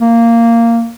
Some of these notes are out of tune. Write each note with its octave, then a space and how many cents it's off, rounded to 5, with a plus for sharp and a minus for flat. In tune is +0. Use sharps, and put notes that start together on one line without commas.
A#3 -10